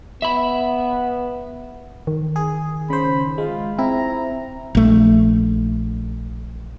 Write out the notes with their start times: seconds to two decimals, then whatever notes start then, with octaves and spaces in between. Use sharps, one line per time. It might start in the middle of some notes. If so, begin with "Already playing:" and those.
0.22 B3 E5 B5
2.07 D#3
2.36 G#4
2.90 C#3 C5 B5
3.38 G#3 F4
3.79 C4 E4 A#5
4.75 A#1 A3